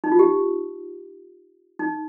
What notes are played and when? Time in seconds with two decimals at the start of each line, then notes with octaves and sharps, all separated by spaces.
0.04 D#4
0.12 F4
0.19 G4
1.79 D#4